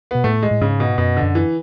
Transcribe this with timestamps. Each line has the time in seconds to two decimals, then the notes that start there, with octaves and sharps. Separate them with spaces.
0.11 B2 B3
0.24 A2 A3
0.43 G#3
0.51 A2
0.61 G#2 C#3
0.80 B2
0.98 F#2 B2
1.17 D3
1.22 F#2
1.35 E3